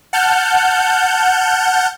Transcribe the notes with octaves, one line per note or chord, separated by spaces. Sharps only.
F#5 A5 F6 G6